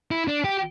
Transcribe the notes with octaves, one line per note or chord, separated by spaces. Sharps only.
E4
D4
G4